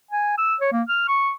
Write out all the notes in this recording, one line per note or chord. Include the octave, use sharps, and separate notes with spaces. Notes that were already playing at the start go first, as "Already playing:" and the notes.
G#5
E6
C#5
A#3
F6
C#6